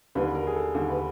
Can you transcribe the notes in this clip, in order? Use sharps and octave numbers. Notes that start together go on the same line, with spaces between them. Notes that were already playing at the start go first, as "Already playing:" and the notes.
D#2 D3 G3 B4
A#4
G#4
A4
D#2 D3 G3 G4
B4